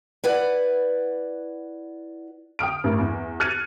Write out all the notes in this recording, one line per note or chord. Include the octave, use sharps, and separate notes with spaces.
E4 B4 D5 F#5
G5 D#6 F6 D7
A1 G2 A#4
E2
F6 F#6 G#6 A6 C#7 D#7